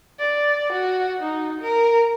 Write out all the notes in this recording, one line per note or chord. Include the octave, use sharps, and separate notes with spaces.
D5
F#4
D#4
A#4